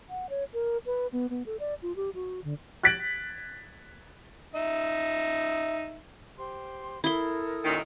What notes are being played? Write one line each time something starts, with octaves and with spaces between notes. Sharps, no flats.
F#5
C#5
A#4
B4
B3
B3
A4
D5
F4
G4
F#4
D3
F#6 G#6 A6 B6 D7 F#7
D#4 E5
G4 C5 C6
E4 A4 A#4 C6 D#6
F#2 A#2 D#3